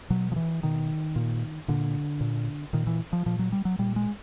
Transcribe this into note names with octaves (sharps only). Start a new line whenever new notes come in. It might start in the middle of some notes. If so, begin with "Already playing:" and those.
B2 F#3
F3
E3
B2 D#3
A#2
A#2 D3
A#2
A#2 D#3
E3
F3
A#2 F3
F#3
G3
F#3
A#2 G3
G#3